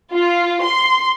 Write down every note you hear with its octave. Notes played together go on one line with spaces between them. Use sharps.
F4
C6